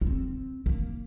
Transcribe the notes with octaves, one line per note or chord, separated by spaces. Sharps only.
A#3
C4
A#3